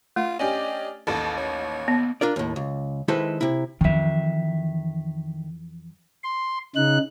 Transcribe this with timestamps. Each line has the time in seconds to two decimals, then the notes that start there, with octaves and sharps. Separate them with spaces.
0.16 A3 F4
0.39 C#4 D4 G4 D#5
1.07 A1 D#2 A4
1.37 C#5
1.88 B3
2.21 D4 F4 A#4 D5
2.36 D#2 A2
2.56 C#2
3.08 D#3 G#3 E4 A4 B4 C5
3.41 C3 E4
3.81 F2 D#3 E3 E5
6.24 C6
6.76 C#3 D#4 F#6